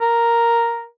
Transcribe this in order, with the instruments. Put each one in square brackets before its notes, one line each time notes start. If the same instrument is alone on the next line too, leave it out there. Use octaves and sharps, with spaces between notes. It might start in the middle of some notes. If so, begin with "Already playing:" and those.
[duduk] A#4